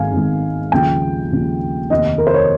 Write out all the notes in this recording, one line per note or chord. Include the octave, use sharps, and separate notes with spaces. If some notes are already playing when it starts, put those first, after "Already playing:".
Already playing: G#1 G#2 D#3 F5 G#5
G#1 G#2 D#3
D#2 C#3 F3 G5
D#2 C#3 F3
F1 D#2 D#3 D#5
A#4
C5
C#5